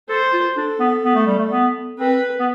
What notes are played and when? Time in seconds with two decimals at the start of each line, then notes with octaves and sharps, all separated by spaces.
0.09 A4 C5
0.33 F4
0.56 D4 A4
0.80 B3
1.04 B3
1.15 A3
1.26 G3
1.38 A3
1.51 B3
1.98 C4 B4
2.39 B3